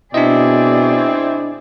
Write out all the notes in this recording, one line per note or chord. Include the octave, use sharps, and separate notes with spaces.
B2 C4 D4 E4 G#4 D5 D#5